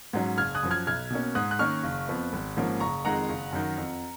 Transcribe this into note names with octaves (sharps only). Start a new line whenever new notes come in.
G#2 F#3 C#4
F#1 F6 G#6
D#6 F#6
F#2 F3
F6 G#6
B1 F6 G#6
B2 A#3 C#4
G#2 D#6 F#6
F#6
D#3 A#3 C#4 C#6 F6
F#1
F2 F3 B3
G#1
G#2 F3 A#3 C#4
F#1 A#5 C#6
F2 D#3 G#3 F#5 A#5
F#1
F#2 D#3
F2